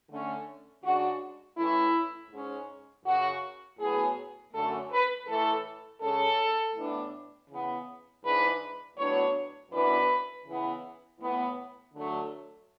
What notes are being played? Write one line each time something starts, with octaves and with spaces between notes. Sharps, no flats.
D3 A3 C#4
C#3 G#3 D4 F#4
A2 E3 A3 C#4 E4
G#2 G#3 C#4
F#2 C#3 F#3 F#4
A2 F#3 B3 G#4
F#2 D3 A3 C#4 A4
B4
A2 E3 A3 A4
C#3 G#3 C#4 A4
A2 E3 B3 D4
C#3 E3 B3
G#2 E3 G#3 D4 B4
A2 F#3 B3 D4 C#5
F#2 E3 B3 D4 B4
C#3 E3 B3
A2 E3 B3
D3 F#3 A3 D4